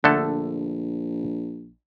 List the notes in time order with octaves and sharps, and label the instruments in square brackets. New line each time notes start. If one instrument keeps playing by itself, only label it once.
[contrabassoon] A#1 [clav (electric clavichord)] D3 A3 A4